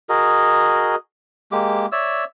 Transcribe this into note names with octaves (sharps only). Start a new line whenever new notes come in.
F#4 G#4 A#4 D#5
G#3 A#3 G4 D6
C#5 D5 E5 E6